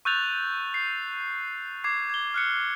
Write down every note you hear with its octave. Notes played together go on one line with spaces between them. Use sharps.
C#6 E6 F#6 G6 A6 F7
C7
D6 G#6 C7
G#6 G7
F6 F#6 C#7